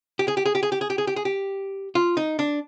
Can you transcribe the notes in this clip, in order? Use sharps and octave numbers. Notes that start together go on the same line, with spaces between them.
G4
G#4
G4
G#4
G4
G#4
G4
G#4
G4
G#4
G4
G#4
G4
F4
D#4
D4